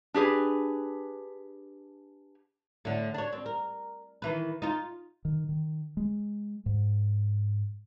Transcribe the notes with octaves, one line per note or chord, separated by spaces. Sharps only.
D4 G4 G#4 B4
A2 D3
D4 C#5
C4
A#4
D#3 E3 B4
D#4 F4
D#3
D#3
G#3
G#2